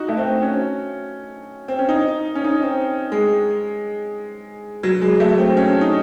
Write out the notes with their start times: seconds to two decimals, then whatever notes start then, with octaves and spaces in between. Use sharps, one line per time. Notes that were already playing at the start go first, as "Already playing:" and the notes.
Already playing: D#4 F#4
0.08 A3
0.17 C4
0.42 C#4
1.68 C4
1.79 C#4
1.89 D#4
2.35 C#4
2.44 D#4
2.62 C4
3.12 G#3
4.83 F#3
5.01 G#3
5.20 A3
5.38 C4
5.57 C#4
5.81 D#4